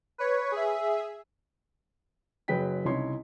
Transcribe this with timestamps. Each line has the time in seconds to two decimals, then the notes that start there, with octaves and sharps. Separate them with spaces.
0.18 B4 C#5
0.52 G#4 E5
2.48 F#1 F#3 G#4 B4 G5 B6
2.85 C2 C#3 D#4 E4 C#5 C6